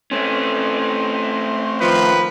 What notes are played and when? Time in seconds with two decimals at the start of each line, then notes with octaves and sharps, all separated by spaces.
0.11 A3 C4 C#4
1.80 D#3 F3 B4